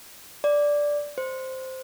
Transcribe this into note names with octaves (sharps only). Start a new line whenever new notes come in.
D5
C5